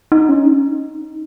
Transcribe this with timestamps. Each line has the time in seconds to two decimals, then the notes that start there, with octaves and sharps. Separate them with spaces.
0.12 D#4
0.29 C#4
0.47 D#4